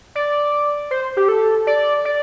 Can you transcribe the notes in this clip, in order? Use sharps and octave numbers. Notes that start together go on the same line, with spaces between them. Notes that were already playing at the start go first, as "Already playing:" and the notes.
D5
C5
G4
A4
D5
D5